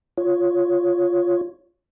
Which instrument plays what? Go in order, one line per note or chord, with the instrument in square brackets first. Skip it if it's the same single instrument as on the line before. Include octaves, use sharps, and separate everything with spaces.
[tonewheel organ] F4 C#5